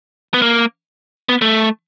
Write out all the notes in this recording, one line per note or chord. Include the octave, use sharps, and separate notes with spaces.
B3
A#3
B3
A3